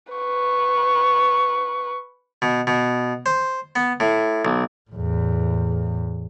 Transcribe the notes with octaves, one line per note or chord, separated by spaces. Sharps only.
B4 C#6
B2
B2
C5
B3
A2
B1
E2 A2